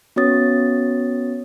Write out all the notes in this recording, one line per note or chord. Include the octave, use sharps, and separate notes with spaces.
B3 C#4 F#4 C#5 D#6 A6